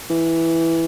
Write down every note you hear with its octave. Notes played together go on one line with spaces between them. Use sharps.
E3